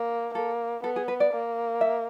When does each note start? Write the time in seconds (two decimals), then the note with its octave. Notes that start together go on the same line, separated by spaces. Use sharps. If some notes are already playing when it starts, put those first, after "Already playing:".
Already playing: A#3
0.34 A#3 A4
0.83 B3 A4
0.96 G#4
1.08 B4
1.20 D5
1.33 A#3
1.81 E5